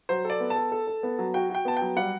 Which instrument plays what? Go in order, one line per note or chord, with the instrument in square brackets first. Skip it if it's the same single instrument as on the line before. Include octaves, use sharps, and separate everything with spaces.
[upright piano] F#3 [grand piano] C5
[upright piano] A4
[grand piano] D5
[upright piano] B3
[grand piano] A5
[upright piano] A4
A4
A4
B3
F#3
[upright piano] F#4 [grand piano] G5
[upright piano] F#4 [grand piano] G5
[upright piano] B3 [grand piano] A5
[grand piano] G5
[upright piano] F#3
[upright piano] G3 [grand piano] F#5